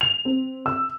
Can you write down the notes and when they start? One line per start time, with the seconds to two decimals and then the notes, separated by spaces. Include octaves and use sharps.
0.01 F7
0.25 C4
0.66 E6